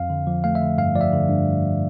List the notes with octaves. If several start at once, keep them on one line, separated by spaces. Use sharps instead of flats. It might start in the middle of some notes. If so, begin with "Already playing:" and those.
Already playing: F2 F5
D3
F3
A3 F5
E5
D3
G2 F5
F3 D5
E5
D3
G2